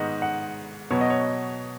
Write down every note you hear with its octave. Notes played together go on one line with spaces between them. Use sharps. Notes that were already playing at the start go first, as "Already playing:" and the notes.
Already playing: G#2 D#3 B3 D#5 F#5
F#5
B2 F#3 B3 C#5
D#5
C#5